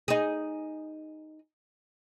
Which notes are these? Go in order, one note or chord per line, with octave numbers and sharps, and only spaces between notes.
D#4 G#4